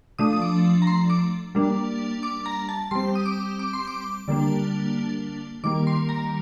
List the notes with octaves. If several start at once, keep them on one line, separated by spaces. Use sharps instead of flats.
F3 A3 D4 D#6
D#6
D6
A#5
C6
D6
G3 A#3 D4
D6
A#5
A5
G3 C4 C6
D#6
D6
D6
C6
D6
D3 G3 A#3 D4
D#3 G3 A#3 D6
C6
A#5